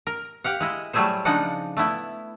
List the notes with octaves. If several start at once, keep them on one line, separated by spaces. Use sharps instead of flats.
A#4
G4 F5 F#5
G#3 E4 D#5
F#3 G3 A3 E4 G#4 C5
C#3 F3 G#3 D4 D#4 F#5
A3 B3 E4